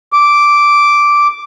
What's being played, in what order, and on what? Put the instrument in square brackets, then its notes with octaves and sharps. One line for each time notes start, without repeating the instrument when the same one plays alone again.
[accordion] D6